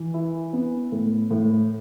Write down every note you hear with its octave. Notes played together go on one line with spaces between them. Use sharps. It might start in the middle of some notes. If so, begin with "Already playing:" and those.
Already playing: E3
E4
B3
A2
A2